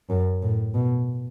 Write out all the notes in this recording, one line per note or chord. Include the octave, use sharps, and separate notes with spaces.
F#2
A2
B2